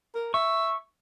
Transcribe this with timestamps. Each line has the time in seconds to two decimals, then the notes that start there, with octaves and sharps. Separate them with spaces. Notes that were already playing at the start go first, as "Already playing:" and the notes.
0.15 A#4
0.34 E5 C#6